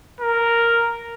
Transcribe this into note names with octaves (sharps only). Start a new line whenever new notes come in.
A#4